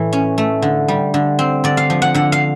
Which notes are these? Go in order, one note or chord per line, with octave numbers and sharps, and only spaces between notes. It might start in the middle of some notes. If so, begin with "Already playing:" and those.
Already playing: A2 E3
C#4
A3
D3
G3
D3
C4
D3 D5
F5
F3
F#5
D3 F#5
F5